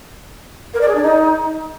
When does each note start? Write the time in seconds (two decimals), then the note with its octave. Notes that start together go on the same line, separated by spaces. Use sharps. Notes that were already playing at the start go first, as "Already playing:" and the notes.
0.74 A#4
0.81 D5
0.88 G#4
0.95 D4
1.02 D#4